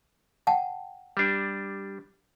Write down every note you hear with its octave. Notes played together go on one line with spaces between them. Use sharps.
F#5 G5 A5
G3 D4